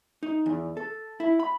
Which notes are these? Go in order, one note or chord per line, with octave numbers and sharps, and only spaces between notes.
D#4
E2
A4
E4
B5